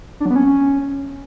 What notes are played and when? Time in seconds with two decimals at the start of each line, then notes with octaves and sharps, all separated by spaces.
0.20 D4
0.25 F#3
0.31 B3
0.36 C#4